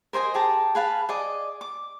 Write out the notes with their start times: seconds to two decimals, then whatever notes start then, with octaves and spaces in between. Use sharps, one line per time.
0.13 A#4 C5 D#5 G#5
0.34 G4 G#4 A5 A#5
0.75 G#4 B4 F5 A5
1.09 G#4 D5 D#5
1.61 D6